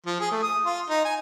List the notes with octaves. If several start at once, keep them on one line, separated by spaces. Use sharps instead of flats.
F3
G#4
A3
D#6
F4
D#4
G#5